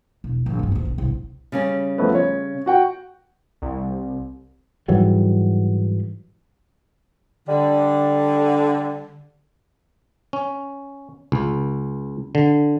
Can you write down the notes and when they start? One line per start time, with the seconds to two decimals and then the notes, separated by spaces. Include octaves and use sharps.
0.24 E1
0.46 A#1 D#3
0.59 D2 G2
0.72 D2 A#2
0.85 A#1
0.98 G1 C2
1.52 C#3 G3 C#4
1.98 F3 A3 B3
2.15 C#5
2.66 F#4 F#5 G5
3.62 C2
4.88 G#2 E3 F#3 G3
7.48 D3 G3
10.33 C#4
11.32 C#2
12.35 D3